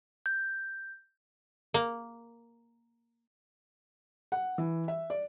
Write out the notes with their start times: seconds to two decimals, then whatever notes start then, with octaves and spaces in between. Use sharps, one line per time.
0.26 G6
1.74 A#3
4.32 F#5
4.58 E3
4.88 E5
5.10 D5